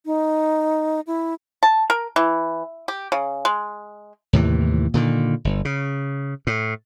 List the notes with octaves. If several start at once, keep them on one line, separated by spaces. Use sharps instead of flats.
D#4
E4
A5
A#4
E3
G4
C#3
G#3
D#2 A2 C3 E3
A#2 D3 D#3
G1
C#3
A2